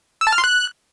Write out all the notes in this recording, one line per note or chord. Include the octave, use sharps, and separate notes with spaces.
E6
A5
F6
C6
F#6